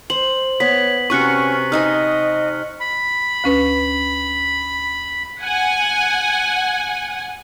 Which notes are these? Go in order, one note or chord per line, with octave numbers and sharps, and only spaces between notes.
C5 F#7
B3 C#5 B6
C3 C#4 F#4 B4 C#6 F#6 C#7
D#4 D#5 E5 G#5 F6
B5
D2 C#4 B4
F#5 G#5